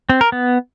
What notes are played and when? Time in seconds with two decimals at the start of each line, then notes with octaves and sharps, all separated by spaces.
0.09 C4
0.21 A#4
0.32 B3